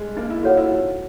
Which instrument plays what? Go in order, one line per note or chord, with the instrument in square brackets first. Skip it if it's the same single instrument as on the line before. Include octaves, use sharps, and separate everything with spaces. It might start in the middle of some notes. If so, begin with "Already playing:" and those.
Already playing: [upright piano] G3 G#3
[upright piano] A#3 [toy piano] D#4
[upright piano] E4
[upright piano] F4 [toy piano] F#4 A4 C#5 F#5
[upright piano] E4
[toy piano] D#4